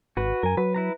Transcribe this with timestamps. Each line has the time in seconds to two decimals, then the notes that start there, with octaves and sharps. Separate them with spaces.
0.17 G#1 F#4 B4
0.43 F#2 A#4 G#5
0.57 F#3 B4
0.74 E4 B4 A#5